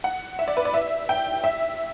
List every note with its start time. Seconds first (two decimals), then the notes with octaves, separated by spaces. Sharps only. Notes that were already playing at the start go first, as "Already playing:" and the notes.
0.04 F#5
0.39 E5
0.48 D5
0.57 B4
0.65 D5
0.74 E5
1.09 G5
1.44 E5